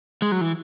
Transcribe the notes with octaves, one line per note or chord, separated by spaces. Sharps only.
G#3
F#3
E3